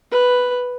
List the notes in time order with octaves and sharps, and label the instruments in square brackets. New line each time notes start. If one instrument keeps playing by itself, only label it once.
[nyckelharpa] B4